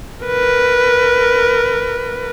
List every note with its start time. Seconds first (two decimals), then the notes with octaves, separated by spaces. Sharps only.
0.25 A#4 B4